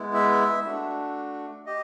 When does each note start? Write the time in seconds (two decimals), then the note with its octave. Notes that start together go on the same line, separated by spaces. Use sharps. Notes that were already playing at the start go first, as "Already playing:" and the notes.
Already playing: G#3 B3 E4
0.14 E5
0.65 A3 D4 F#4
1.66 G4 D#5